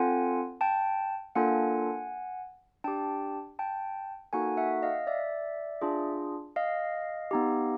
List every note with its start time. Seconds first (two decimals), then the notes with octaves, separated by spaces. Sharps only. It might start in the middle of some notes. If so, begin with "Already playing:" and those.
Already playing: C4 F4 A4 F#5 G#5
0.61 G5 A5
1.36 A#3 D4 F4 A4 F#5 G#5
2.84 D4 G4 G5 A5
3.59 G5 A5
4.33 A#3 D#4 F#4 A4 F#5 G#5
4.57 E5 F#5
4.83 D#5 F5
5.07 D5 E5
5.82 D4 F4 G#4
6.56 D#5 F5
7.31 B3 D#4 G4